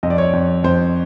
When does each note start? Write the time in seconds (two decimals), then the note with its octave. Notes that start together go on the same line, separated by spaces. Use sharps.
0.03 F2 D#5
0.10 D5
0.18 C#5
0.25 D5
0.33 F2
0.64 F2 C5